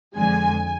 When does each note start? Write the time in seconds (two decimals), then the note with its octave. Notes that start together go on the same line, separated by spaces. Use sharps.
0.14 F2 D3 G#3 G#5